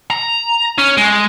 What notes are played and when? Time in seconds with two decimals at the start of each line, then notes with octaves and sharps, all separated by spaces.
0.10 A#5
0.78 C#4
0.97 G#3